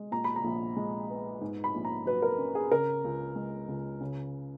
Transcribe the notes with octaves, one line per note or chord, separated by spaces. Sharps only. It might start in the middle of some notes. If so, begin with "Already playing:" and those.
Already playing: G#3
A#2 A#5
B5
A#5
A#1
G#3
B3
G#2
B5
A#1
A#5
F#3 B4
A#4
C#4
G#4
C#3 A#4
C#2
G#3
C#2
C#3